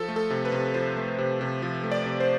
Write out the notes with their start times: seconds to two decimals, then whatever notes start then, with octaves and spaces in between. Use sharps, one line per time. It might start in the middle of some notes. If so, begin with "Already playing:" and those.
Already playing: F3 A4
0.08 A3
0.16 A4
0.30 C3
0.45 B4
0.52 C3
0.74 F3 C5
0.97 A3
1.18 C3
1.41 C3
1.62 F3
1.83 A3
1.92 D5
2.06 C3
2.20 C5